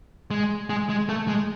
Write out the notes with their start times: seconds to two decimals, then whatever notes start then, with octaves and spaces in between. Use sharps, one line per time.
0.31 G#3
0.70 G#3
0.89 G#3
1.09 A3
1.28 G#3